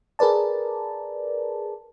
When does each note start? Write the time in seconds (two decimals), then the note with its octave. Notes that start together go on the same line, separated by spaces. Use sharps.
0.19 G#4 A#4 B4 D5 A5